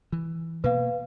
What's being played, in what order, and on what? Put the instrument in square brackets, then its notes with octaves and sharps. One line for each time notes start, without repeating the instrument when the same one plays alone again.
[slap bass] E3
[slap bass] B2 A#3 [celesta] B4 F5